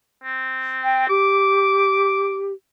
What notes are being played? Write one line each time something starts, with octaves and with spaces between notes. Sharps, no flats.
C4
G5
G4 D6